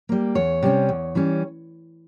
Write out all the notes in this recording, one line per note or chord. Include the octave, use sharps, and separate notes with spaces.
G3 A#3
E2 C#5
C3 G3 C#4
E2
E3 G3 C#4